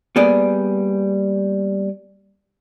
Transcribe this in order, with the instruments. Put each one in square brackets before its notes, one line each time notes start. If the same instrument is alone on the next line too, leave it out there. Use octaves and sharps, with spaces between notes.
[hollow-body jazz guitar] G3 A#3 B3 G#4 D5